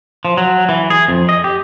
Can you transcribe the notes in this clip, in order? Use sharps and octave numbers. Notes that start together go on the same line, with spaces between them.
F3
F#3
E3
G#4
F2
D#5
G4